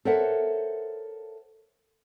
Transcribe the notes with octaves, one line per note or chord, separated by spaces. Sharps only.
A4 A#4 C5 C#5 E5 F#5